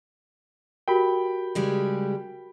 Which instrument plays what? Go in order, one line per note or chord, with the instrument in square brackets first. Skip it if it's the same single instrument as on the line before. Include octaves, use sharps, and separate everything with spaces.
[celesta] F#4 G4 A#4 [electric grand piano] G5 B5
[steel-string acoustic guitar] C#3 G3 G#3